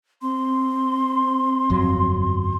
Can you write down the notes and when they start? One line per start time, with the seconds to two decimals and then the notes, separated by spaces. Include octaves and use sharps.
0.22 C4 C6
1.70 G1 F2 F#3